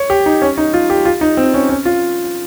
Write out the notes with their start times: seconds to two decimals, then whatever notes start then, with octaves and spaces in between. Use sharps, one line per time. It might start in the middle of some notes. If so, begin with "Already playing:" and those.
Already playing: C#5
0.10 G4
0.26 D#4
0.42 C#4
0.58 D#4
0.73 F4
0.90 G4
1.05 F4
1.21 D#4
1.37 C4
1.54 C#4
1.69 C#4
1.85 F4